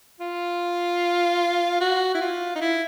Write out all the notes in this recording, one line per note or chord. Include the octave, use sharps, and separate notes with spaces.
F4
F#4
E4
F4
D#4
E4